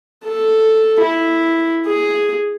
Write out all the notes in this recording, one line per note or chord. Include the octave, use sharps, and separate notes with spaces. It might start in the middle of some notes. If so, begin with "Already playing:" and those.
A4
E4
G#4